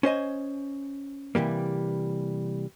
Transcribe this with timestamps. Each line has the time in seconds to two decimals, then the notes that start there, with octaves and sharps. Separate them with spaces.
0.03 C#4 C5 D#5 G#5
1.35 C3 E3 G3 A#3